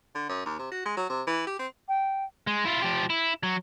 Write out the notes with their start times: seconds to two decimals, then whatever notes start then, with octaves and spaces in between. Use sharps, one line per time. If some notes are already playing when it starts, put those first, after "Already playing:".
0.15 D3
0.29 F#2
0.45 D#2
0.59 C3
0.71 F#4
0.85 G#3
0.97 F#3
1.10 C3
1.27 E3
1.47 G4
1.59 C4
1.88 G5
2.47 G#3
2.65 E4 F4
2.82 F3 G4
3.10 E4
3.43 F#3